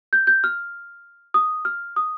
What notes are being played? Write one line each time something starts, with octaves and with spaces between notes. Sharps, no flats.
G6
G6
F6
D#6
F6
D#6